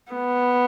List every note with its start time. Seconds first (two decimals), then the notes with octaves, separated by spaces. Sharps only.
0.12 B3